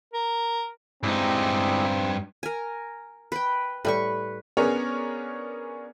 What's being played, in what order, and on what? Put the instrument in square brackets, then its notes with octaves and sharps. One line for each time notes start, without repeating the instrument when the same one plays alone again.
[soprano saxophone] A#4
[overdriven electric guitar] G2 D#4 [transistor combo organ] G3 G#3 E4 [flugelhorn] C4
[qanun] A#4 G#5
B4 G5
[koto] A2 G3 [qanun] B4 C#6
[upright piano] B3 C#4 D4 G#4 A#4 C#5